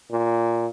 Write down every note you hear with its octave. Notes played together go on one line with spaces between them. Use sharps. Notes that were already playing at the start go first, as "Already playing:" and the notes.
A#2